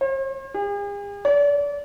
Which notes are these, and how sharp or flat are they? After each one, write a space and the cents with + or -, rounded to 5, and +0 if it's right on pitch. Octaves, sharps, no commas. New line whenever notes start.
C5 +45
G#4 -45
D5 -35